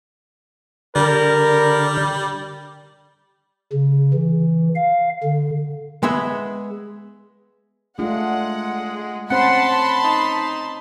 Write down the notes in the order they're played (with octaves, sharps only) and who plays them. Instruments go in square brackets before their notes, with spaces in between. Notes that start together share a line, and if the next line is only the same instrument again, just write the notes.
[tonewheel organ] D3 [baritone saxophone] G3 [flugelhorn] A#4
[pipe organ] C#3
E3
F5
D3
[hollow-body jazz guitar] G#3 B3 G#4 E5
[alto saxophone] G#3 [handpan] A3 D4 F4 [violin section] F#5
[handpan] C4 C#4 C5 [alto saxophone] F#5 [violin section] A5 B5 C6
[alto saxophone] D#4